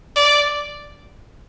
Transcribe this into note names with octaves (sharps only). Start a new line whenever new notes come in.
D5